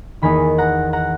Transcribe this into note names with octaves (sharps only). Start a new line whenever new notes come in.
E2 D#3 A#3 D#4 G#5 B5
F#5 A#5
F#5 A#5